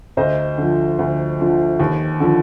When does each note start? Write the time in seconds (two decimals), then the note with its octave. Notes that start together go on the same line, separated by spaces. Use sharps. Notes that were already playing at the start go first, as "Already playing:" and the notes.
0.17 D2 C5 D#5
0.58 D3 F3
0.99 D2
1.40 D3 F3
1.80 D#2
2.20 D3 F3